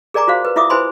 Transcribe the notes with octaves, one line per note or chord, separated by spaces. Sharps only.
G#4 A#4 D5 G#5 A#5 D6
F4 F#4 C5 F5
B4
E4 F4 E5 D6 D#6
E4 B4 C5 G#5 B5 C6